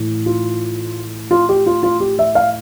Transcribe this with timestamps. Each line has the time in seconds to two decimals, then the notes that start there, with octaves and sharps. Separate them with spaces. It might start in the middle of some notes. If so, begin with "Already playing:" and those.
Already playing: A2 E3
0.26 F4
1.31 F4
1.49 G4
1.66 F4
1.83 F4
2.00 G4
2.19 E5
2.35 F5